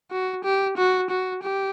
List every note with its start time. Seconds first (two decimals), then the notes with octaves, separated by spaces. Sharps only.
0.11 F#4
0.44 G4
0.77 F#4
1.10 F#4
1.42 G4